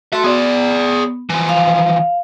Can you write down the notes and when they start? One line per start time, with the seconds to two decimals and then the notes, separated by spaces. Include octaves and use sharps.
0.13 F#4 A4 E5 C6
0.24 B3 G#4 D5
1.30 E3 F3
1.49 F5